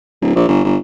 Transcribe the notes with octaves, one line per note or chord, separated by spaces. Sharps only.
D1
A#1
G1
G1